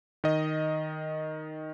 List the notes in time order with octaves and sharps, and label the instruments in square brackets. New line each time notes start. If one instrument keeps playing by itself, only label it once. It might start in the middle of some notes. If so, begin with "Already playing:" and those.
[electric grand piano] D#3 D#5